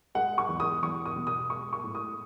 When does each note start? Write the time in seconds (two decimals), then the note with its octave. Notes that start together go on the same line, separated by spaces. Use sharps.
0.15 G#3 F#5
0.38 C#6
0.49 E2
0.60 D#6
0.82 E2 C#6
1.05 D#6
1.16 B2
1.27 D#6
1.50 G#3 C#6
1.73 C#6
1.84 A2
1.95 D#6